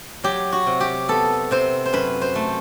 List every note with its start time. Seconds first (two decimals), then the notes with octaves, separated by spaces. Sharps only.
0.24 F#3 G4
0.52 F#4
0.66 C3
0.80 G4
1.08 B3 A4
1.51 C3 C5
1.86 C5
1.93 F#2 B4
2.21 C5
2.35 A3